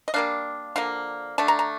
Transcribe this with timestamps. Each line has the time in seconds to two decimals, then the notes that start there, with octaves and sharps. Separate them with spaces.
0.08 D#5
0.14 G3 A#3 D4 F5
0.76 D3 F3 A#3 F5
1.38 D3 A3 D4 A5
1.48 A#5
1.59 A#5